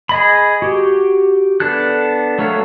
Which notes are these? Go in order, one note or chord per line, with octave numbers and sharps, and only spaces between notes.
G#4 D#5 B5
F#4 G4
B3 D4 A4 F#6
F#3 A3 A4 C#5 F5